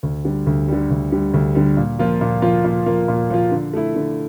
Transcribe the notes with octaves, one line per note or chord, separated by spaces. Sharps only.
D2
D3 G3
D2
D3 G3
D2
D3 G3
D2
D3 G3
A#2
F3 A#3 F4
A#2
F3 A#3 F4
A#2
F3 A#3 F4
A#2
F3 A#3 F4
D3
A3 E4
D3